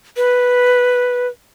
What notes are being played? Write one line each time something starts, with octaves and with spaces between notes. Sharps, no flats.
B4